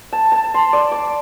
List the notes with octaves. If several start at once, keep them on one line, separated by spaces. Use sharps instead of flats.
A5
A5
C6
D5
D6